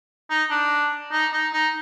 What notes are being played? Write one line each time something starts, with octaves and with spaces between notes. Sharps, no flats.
D#4
D4
D#4
D#4
D#4